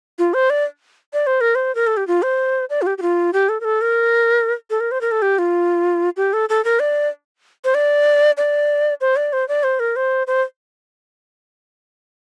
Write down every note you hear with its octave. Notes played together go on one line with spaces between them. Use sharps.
F4
C5
D5
D5
C5
A#4
C5
A#4
A4
G4
F4
C5
D5
F4
G4
G4
F4
G4
A4
A#4
A4
A#4
A4
A#4
C5
A#4
A4
G4
F4
G4
A4
A4
A#4
D5
C5
D5
D5
C5
D5
C5
D5
C5
A#4
C5
C5